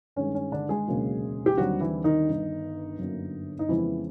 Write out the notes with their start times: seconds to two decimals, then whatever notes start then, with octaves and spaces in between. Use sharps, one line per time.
0.16 G2 D#3 G#3 C#4
0.35 C#4
0.52 D3 D4
0.69 G#3 G#4
0.88 E1 D2 C#3 F#3 A#3
1.46 G4
1.57 D#2 D3 F#3 G3 C4 F#4
1.81 E3 E4
2.04 D#3 D#4
2.28 G1 G2 D#3
2.98 G1 F#2 D3 F#3 A#3
3.59 D#4
3.69 F2 C#3 E3 G#3 B3 E4